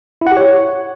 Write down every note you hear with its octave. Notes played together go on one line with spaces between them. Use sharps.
E4
F#5
G4
C#5